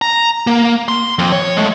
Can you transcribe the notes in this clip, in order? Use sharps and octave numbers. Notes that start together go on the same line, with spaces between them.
A#5
A#3
C6
F2
C#5
G#3 A3